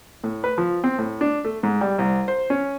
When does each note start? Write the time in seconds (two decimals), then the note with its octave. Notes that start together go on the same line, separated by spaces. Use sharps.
0.24 A2
0.44 B4
0.58 F3
0.84 C4
0.99 A2
1.21 D4
1.45 A3
1.63 G#2
1.81 G3
1.98 C2
2.28 C5
2.50 C#4